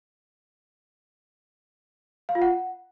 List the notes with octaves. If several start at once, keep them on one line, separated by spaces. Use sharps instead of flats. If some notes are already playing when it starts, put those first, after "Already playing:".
F5
F4
F#5